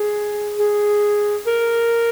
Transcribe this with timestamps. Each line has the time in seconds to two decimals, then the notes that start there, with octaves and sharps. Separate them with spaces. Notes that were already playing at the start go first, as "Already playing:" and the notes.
Already playing: G#4
0.59 G#4
1.46 A#4